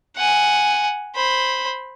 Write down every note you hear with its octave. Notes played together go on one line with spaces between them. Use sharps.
F#5 G#5
C5 B5